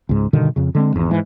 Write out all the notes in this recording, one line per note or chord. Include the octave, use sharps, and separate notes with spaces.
C#2 G#2
G2 B2 D3 D#3
F2 C#3
D3 G#3 C4
G#1 E2
G#2 E3